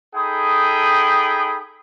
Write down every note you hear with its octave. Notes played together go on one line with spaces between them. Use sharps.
D#4 G#4 A4 G5 B5 D#6